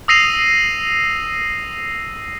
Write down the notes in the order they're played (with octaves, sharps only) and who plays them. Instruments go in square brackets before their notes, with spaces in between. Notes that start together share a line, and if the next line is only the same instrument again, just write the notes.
[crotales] D#6 E6 A#6 C7 D#7 F7